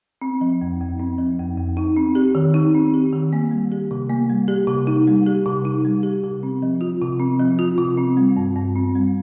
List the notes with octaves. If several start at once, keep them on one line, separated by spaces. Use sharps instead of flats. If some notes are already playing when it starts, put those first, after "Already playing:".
C4
F3
F2
F2
C4
F3
F2
F2
D#4
C4
G4
D#3
D#4
C4
G4
D#3
A#3
G3
G4
C3
A#3
G3
G4
C3
D#4
G3
G4
C3
D#4
G3
G4
C3
C4
F3
F4
C3
C4
F3
F4
C3
C4
G3
G2
G2
C4
G3